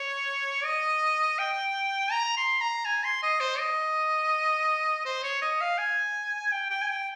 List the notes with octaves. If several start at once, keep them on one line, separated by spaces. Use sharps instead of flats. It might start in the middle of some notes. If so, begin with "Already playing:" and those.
Already playing: C#5
D#5
G5
A#5
C6
A#5
G#5
C6
D#5
C5
D#5
C5
C#5
D#5
F5
G#5
G5
G5
G#5
G5